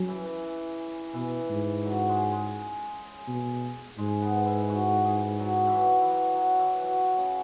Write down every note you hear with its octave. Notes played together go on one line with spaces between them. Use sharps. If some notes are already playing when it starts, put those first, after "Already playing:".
Already playing: C#3 F#3
E3
E3
B2 E3
G#2
F#3
G#3
G#3
B2
G#2 G#3
B3
E4
F#4
G#4
F#3
E3
F#3
E3
F#3
F#3
E3
F#3
C#3